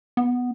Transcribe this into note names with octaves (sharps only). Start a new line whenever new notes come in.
B3